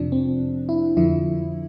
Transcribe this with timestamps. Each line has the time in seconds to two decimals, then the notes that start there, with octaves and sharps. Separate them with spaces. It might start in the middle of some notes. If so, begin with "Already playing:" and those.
Already playing: F2 C3 F3 D4
0.12 C4
0.69 E4
0.97 F2 D3 F3 E4